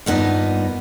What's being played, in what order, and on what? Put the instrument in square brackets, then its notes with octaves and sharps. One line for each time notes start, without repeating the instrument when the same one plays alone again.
[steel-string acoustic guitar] G2 A#2 B3 D#4